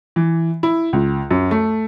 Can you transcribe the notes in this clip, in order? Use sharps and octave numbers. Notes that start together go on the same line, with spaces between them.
E3
E4
C#2
F#2
A3